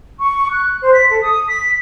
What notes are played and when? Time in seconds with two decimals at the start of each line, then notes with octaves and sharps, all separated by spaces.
0.19 C#6
0.51 F#6
0.82 C5
0.94 B6
1.10 A4
1.22 D#6
1.48 B6